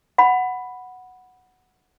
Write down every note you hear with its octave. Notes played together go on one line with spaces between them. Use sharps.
F#5 B5